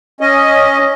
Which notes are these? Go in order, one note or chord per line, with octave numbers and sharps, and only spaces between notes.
C#4 D#5